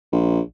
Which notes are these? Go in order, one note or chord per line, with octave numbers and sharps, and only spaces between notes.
A#1